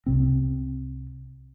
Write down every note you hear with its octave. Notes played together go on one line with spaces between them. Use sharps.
C2 C3 C4